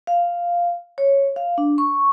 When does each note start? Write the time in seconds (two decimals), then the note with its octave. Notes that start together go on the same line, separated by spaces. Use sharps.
0.07 F5
0.98 C#5
1.36 F5
1.58 D4
1.78 C#6